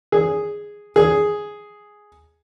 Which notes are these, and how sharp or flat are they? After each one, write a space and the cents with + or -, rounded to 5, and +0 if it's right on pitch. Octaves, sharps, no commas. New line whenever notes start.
G#4 -5
G#4 +0